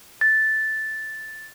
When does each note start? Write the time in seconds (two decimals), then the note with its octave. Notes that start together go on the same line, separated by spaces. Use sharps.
0.21 A6